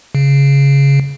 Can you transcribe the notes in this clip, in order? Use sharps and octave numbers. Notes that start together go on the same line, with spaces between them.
C#3